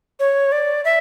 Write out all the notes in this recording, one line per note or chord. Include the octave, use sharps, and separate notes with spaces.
C#5
D5
E5